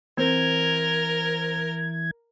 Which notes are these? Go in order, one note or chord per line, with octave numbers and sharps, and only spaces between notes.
E3 C4 A#4 G#6